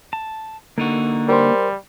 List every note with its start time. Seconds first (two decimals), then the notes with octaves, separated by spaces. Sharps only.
0.13 A5
0.78 D3 A#3 D#4 F#4
1.28 G3 A#4 C5 C6